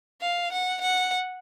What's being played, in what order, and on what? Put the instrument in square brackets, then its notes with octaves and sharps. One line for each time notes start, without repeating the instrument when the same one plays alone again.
[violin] F5
F#5
F#5